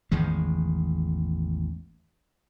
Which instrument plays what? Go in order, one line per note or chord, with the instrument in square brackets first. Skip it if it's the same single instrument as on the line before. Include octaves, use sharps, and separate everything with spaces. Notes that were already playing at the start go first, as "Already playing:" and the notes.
[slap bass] A1 E2 D#3 G#3